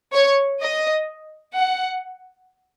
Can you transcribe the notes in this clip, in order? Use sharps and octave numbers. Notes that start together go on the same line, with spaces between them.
C#5
D#5
F#5